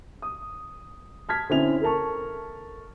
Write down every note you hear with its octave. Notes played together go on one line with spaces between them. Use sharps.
D#6
A5 F6 G#6 B6
D3 C4 C#4 E4 F7
A4 A#4 A5 C#6